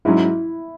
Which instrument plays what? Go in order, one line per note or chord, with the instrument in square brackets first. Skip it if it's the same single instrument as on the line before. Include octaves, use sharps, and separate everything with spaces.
[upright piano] G#2 F#3 C#4 [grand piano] E4